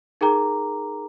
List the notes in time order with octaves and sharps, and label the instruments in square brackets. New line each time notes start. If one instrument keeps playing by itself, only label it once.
[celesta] D#4 G#4 A#4 G5 A#5 D6